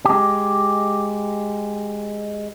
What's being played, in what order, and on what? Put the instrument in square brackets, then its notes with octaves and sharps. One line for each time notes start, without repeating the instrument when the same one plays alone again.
[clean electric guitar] G#3 G4